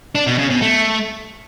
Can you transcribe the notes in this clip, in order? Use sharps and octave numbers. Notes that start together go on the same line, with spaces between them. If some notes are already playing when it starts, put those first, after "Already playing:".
D4
B2
C#3
B2
A3